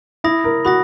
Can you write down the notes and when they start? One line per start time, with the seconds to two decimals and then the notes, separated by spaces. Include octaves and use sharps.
0.24 E4 B5 D#6 A#6
0.44 A#4
0.65 F#4 B5 D#6 A#6